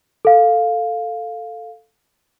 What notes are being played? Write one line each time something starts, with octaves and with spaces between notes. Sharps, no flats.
A4 F5